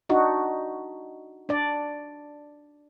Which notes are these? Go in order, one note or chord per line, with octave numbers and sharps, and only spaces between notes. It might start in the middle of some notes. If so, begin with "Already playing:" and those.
D4 D#4 F#4
D4 D5